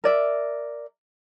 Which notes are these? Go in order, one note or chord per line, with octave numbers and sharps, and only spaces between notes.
A#4 D5 E5